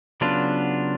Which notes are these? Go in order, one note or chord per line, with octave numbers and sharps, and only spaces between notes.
C#3 F#3 B3 D4 F4